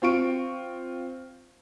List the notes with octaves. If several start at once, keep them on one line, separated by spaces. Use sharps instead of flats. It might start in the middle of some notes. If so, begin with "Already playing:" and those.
C4 F4 C#6 D7